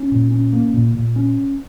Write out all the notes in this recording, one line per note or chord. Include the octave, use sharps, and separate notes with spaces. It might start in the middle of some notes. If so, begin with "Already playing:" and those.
Already playing: C#4
A#2
C#4
A#3
A#2
A#2
C#4